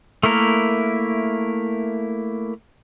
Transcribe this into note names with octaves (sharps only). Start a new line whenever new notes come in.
A3 A#3 E4 A#4